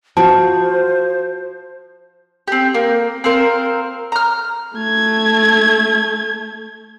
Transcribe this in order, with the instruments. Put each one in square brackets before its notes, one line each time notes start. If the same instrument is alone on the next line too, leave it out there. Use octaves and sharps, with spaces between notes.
[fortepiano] F3 [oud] F#4 [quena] C5 [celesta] A5
[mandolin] C4 G4
A#3
C4 F4 A#4 C5
A#5 F6
[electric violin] A3 G#6